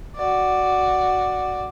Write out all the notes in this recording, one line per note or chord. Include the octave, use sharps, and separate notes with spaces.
F#4 D5